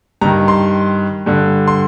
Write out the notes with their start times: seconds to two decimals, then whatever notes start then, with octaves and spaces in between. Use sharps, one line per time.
0.21 G2 A#5
0.25 D#3
0.48 C6
1.26 G2 D3
1.68 C6